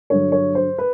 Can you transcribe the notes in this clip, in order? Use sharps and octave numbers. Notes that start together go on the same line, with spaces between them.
G2 D3 F#3 C#5
C#5
C5
B4